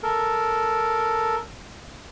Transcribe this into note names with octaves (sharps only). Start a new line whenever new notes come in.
A4 A#4